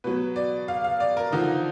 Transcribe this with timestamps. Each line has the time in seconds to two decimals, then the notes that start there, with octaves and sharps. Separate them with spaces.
0.04 B2 F#3 B4
0.36 D5
0.68 F5
0.84 F5
1.00 D5
1.17 A#4
1.32 D3 F3 D#4